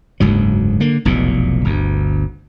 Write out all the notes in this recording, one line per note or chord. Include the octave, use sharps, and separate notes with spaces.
F#1 D2 G#2 F#3
D3 A#3
F1 B1 E2 A#2
G1 D2